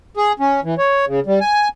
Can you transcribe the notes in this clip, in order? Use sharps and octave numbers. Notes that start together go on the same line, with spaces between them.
G#4
C#4
E3
C#5
C#3
G3
G#5